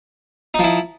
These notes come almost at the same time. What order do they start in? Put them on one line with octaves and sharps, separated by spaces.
D#4 F3 E4